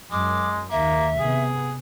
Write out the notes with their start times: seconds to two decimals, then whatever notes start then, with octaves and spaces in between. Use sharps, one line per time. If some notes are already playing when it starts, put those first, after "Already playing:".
0.12 F#2 G#3 D6
0.71 D#2 D#3 A#3 E5
1.20 C3 B3 G#4